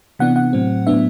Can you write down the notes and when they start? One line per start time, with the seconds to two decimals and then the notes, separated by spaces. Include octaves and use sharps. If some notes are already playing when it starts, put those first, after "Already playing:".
0.19 C3 E3 B3 D4 F#5
0.36 F#5
0.53 A2 F#3 C4
0.87 A2 F#3 B3 D4 E5